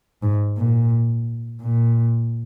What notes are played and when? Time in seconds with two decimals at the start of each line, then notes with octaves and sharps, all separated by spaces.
0.23 G#2
0.58 A#2
1.62 A#2